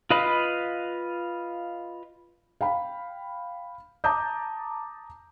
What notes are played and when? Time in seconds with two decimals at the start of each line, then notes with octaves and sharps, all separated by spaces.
0.10 F4 B4 D#5 F5 B5
2.61 F5 G5 B5
4.04 A5 A#5 D6 D#6 G6